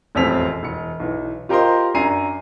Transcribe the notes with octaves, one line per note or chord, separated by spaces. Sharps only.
E1 A1 F2 C4 B6 F7
E1 C#7
B1 E3
F4 G4 A#4 C5 D#5 C6
F#2 D4 G#5 A#5 C7 D#7